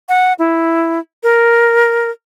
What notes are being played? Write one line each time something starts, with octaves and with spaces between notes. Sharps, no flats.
F#5
E4
A#4